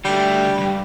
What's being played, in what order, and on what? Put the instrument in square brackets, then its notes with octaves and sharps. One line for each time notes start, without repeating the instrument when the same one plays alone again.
[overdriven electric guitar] D3 A3 [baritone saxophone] G3
[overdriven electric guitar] C2 G2